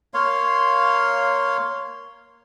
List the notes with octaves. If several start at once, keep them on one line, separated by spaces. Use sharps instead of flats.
A#3 C#5 F5 C6